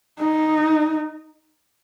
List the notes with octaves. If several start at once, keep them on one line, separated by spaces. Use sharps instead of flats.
D#4